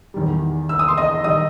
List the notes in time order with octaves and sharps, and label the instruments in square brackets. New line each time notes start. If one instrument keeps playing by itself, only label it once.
[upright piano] E2 D#3 G3
E6
D#6
C6
D#5 D#6
D#3 G3 D#5 D#6